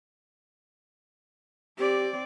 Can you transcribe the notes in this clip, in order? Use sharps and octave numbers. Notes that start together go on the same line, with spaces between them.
C4 G4 D5